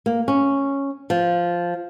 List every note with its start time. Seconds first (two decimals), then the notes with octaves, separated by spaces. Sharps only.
0.06 A#3
0.28 C#4
1.10 F3